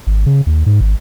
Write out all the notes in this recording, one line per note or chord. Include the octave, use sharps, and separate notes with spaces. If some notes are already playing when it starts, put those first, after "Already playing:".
G#1
C#3
D#2
G#2
G#1